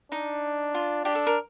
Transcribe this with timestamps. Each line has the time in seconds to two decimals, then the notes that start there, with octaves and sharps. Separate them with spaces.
0.12 D4 D#4
0.74 F4
1.05 D4 G4
1.15 A4
1.27 A#4